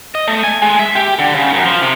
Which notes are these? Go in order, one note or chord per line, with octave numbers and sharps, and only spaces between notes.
D#5
A3
G#5
G#3
E5
G4
D3
C#3
F#2
F3
C3